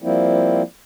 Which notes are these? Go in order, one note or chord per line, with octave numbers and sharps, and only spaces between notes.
F3 G3 A#3 C4 E4